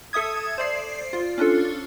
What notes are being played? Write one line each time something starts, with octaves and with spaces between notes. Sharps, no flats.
A4 E5 D#6 G#6
C5 D5 C7
F4
C#4 D4 F4 A4